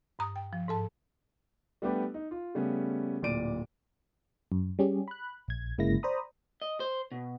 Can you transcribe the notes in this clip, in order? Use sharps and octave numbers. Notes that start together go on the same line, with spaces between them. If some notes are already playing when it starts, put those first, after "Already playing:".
G2 A#5 D#6
G5
F3
G#2 A4 A5
G3 A3 B3 D4 G4 B4
D#4
F4
C#3 G3 A3 B3 C#4
D1 A#2 D5 D7 D#7
F#2
G3 C#4 G4 G#4
B5 F#6
A#1 G#6
G1 C#3 G#3 A#3 E4 A#6
C5 D5 A#5 B5 D#6
D#5
C5
B2